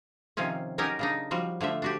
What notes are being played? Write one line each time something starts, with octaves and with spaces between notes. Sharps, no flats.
C3 D#3 F3 C4 C#4
F#3 C#4 D#4 G4 A#4
C#3 D4 D#4
F3 G3 F#4
D3 F3 A3 E5
D4 F#4 G4